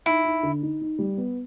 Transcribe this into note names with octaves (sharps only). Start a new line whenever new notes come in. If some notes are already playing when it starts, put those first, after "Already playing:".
D#4 E4
D#4
D3
D#4
D#4
G3
B3